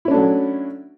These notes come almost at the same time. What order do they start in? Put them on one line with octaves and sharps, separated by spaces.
E4 C#4 D4 A3 F#3